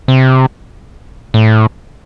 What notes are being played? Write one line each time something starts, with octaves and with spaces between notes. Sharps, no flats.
C3
A2